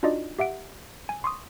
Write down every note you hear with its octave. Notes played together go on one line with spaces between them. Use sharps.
D4 D#4 F4 F#4 D5 D#5
G4 E5 F#5 D7
G#5
C6 C#6 D#6